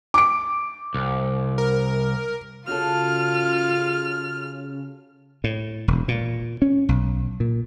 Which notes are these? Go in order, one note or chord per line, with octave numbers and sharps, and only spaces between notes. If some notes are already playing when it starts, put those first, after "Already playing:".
D6 D7
C2
A#4
C#3 F4 F#4 A4 F6
A2
E1
A#2
C#4
B1
A#2